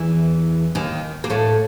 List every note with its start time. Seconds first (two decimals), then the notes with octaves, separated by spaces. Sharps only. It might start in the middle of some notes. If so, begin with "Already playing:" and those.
Already playing: E2 E3
0.75 D#2 D#3
1.24 A#3
1.30 A2 A3